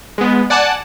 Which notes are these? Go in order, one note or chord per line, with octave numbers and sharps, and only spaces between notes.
G#3 B3
D5 F#5 G#5 A5 D6